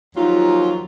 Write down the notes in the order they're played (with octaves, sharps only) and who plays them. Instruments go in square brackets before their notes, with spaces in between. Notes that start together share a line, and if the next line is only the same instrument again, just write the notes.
[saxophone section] D#2 F3 F#3 F4